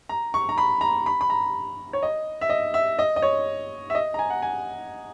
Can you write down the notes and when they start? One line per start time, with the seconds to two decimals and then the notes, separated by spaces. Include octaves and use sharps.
0.09 A#5
0.34 C#6
0.49 A#5
0.58 B5
0.81 A#5
1.06 B5
1.21 B5
1.30 A#5
1.93 C#5
2.03 D#5
2.41 E5
2.50 D#5
2.74 E5
2.99 D#5
3.16 D#5
3.22 C#5
3.90 E5
3.95 D#5
4.14 A#5
4.19 G#5
4.30 F#5
4.42 G#5